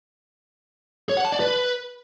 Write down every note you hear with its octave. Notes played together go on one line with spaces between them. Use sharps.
C#5
F#5
A5
D5
B4